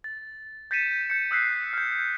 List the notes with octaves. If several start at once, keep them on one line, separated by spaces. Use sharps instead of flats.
A6
G6 A6 B6 C#7 D#7 E7
G6 C#7
D#6 E6 F#6 B6 C7
F6 G6